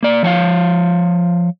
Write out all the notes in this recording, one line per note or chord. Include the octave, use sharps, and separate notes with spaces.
A#3 D5
F3 C#5 E5 F5